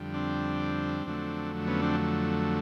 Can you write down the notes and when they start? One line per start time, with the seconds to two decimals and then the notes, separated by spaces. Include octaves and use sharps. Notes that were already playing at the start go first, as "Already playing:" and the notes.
Already playing: F2 D3 G3
0.14 C4 D4
1.06 F2 D3 F#3 A3
1.67 B3 C#4
1.82 C4 D4